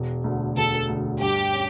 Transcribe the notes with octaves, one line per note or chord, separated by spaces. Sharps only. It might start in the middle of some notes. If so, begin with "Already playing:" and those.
Already playing: E1
D2 D3
E1 A4
D2 D3
G2 G4
C#4